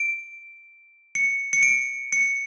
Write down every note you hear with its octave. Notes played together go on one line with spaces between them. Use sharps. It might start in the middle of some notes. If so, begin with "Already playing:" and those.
Already playing: D7
C#7
C#7
D7
C#7